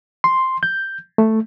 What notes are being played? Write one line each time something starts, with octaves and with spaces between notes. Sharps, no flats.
C6
G6
A3